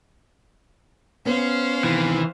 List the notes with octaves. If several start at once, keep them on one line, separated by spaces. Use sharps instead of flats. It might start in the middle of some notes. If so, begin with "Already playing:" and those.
B3 C#4 C5 F5
C3 D#3 E3